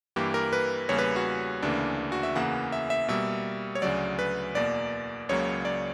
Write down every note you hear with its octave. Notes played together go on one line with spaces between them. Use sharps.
G2 E3 A#3 G4
A#4
B4
E2 C#3 G3 A#3 C#5
B4
F#4
D2 C#3 E3 A#3 D4
F#4
E5
E2 C#3 E3 A#3 F#5
E5
E5
B2 G3 A#3 E5
C#5
D2 C#3 F#3 D5
B4
E2 B2 A#3 D5
C#2 C#3 F#3 A#3 C#5
D5